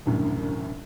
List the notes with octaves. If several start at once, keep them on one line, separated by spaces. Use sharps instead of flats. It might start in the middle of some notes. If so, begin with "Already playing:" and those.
E1 C2 F#2 A2 D3